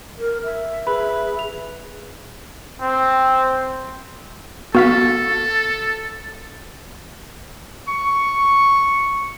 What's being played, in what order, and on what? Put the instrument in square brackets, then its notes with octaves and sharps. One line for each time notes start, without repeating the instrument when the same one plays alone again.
[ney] A#4
E5
[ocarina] G#4 [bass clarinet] B4 [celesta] B5
[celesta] F7
[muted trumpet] C4
[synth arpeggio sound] B3 F5 B6 [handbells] F#4 [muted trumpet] A4
[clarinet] C#6